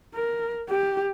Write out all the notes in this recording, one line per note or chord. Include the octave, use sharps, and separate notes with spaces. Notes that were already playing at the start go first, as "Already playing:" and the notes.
A#4
G4